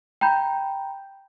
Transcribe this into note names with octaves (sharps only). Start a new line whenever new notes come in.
G5 A#5 B5 G6